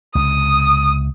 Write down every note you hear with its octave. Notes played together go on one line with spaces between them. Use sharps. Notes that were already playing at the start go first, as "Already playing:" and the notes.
C#2 C3 D#6